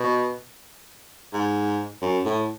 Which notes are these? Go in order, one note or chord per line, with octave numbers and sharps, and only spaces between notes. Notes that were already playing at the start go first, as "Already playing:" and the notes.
Already playing: B2
G#2
F#2
A2